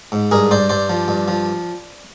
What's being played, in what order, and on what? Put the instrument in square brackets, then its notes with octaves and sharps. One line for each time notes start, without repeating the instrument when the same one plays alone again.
[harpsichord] G#2
G2 G#4 A#4
G2 C5 D5
G2 C5 D5
F3
G2
F3